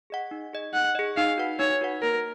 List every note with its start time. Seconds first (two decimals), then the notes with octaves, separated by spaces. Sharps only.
0.10 G#4 D#5 F#5
0.31 D#4
0.53 G#4 D#5
0.73 D#4 F#5
0.95 G#4 D#5
1.17 D#4 F5
1.38 F#4 B4 F#5
1.59 D#4 C#5
1.81 F#4 B4 F#5
2.02 A#3 A#4